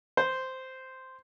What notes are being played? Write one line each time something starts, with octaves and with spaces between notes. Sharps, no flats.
C5